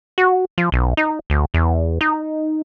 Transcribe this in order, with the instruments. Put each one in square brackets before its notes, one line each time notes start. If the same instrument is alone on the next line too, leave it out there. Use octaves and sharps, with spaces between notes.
[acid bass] F#4
F3
B1
D#4
D2
E2
D#4